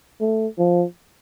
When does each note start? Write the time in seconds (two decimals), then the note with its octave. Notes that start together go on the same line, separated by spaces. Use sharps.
0.21 A3
0.58 F3